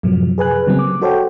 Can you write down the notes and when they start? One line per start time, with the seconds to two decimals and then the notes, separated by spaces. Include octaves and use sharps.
0.03 F#2 A2 C3 F3 F#3
0.38 G#4 B4 G#5 F#6
0.67 C#3 F#3 G3 A#3 C4
0.79 D6
1.02 F#4 A4 C5 C#5 F#5 G5